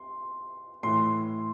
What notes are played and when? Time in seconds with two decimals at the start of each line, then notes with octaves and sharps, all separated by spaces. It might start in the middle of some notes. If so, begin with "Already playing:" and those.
Already playing: C6
0.83 A2 E3 C6